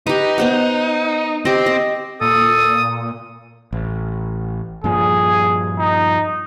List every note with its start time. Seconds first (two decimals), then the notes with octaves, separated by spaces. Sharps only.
0.07 D#4 G4 B4
0.38 B3 C5 F#5
1.45 C4 G4 D#5
1.66 D#5
2.21 A#2 A4 D#6
3.73 A1
4.84 G2 A#2 F3 G#4
5.79 D#4